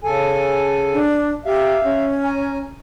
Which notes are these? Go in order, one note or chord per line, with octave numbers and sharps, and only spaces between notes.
C#3 A4 G#5
D4
G4 E5 F5
C#4
G#5 A#5